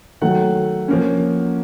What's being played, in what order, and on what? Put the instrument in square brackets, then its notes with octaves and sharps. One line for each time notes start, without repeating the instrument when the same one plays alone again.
[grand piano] D#3 F#3 A3 F#5
F3 A#3 C#4